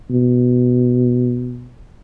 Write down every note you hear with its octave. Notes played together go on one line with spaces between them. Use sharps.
B2